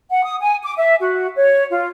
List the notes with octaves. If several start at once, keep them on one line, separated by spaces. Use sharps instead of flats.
F#5
D#6
G#5
D6
E5
F#4
C#5
F4